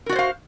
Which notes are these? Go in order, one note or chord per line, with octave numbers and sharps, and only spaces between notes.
F#4 A#4 C5 D5 F5